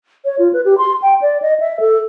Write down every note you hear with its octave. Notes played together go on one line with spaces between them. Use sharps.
C#5
F4
B4
G4
C6
G5
D5
D#5
E5
A4